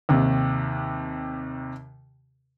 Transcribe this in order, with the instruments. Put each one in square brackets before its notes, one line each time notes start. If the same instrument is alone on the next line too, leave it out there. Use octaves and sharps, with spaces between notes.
[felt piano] D#2 C3